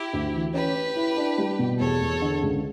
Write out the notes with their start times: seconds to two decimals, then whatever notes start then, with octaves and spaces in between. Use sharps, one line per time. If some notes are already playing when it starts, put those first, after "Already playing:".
Already playing: E4 G4
0.13 D2
0.33 E3
0.54 C#4 G4 B4
0.75 C#4
0.96 E4
1.17 D4
1.38 G3
1.59 B2
1.79 E2 A4 C#5
2.01 E2
2.22 D3
2.42 C#2